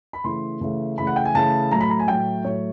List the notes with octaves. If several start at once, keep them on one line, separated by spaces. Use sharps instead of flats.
B5
C#3 E3 A3 C6
C#3 E3 A3
C#3 E3 A3 B5
F#5
G5
G#5
C#3 E3 A3 A5
A2 F#3 A3 A#5
B5
A#5
G#5
A2 F#3 A3 G5
A2 F#3 A3 C#5